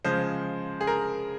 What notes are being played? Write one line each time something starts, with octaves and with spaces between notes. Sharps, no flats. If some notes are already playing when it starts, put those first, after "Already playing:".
C#3 F3 G#3 C5
G#4
A#4